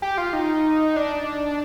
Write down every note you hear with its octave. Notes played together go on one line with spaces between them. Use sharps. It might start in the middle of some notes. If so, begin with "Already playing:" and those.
G4
F4
D#4
D4